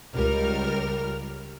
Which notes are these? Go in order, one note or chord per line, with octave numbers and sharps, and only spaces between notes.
C#2 G3 A#4 F6